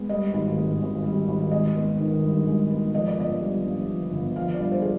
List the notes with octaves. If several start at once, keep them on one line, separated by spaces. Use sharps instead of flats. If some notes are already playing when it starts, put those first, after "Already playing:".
Already playing: G#3 B3
G3 D#5
G#1
G#2
G#1
G3
G#1
G#3 D#5
B3
D#3
G2
G#3
B3
F3 D#5
D5
G1 D#5
G2
G1
F3
G1
F3 F5
D5
G2
C5
G#4